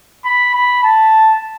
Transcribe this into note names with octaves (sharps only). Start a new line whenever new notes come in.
B5
B5
A5